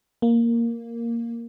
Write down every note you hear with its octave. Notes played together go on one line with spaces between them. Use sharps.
A#3